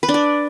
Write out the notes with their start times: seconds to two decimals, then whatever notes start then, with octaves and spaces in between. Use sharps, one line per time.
0.03 B4
0.09 D4
0.14 D5